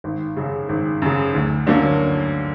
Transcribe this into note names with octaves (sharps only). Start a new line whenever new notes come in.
G#1
F#2 C#3
G#1
F#2 C#3
D2
D3 F#3 A#3 C#4